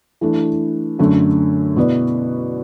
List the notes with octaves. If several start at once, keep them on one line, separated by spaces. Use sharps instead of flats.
E3 A3 D4
F#2 D3 A3
B2 B3 E4 B4 D5